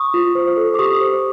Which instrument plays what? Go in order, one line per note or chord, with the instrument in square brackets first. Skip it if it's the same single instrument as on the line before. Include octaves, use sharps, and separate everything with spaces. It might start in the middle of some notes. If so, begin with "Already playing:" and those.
Already playing: [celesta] C#6 D#6
F4
C5
A4
D6
G4 C#6 D#6
C5